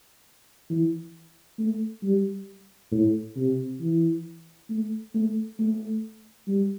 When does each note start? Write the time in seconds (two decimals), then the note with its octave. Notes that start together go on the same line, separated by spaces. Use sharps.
0.70 E3
1.59 A3
2.03 G3
2.92 A2
3.37 C3
3.81 E3
4.70 A3
5.15 A3
5.59 A3
6.48 G3